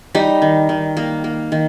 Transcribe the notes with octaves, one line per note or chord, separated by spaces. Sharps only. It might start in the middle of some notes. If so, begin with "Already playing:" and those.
G3 D#4
D#3
D#3
A#3
A#3
D#3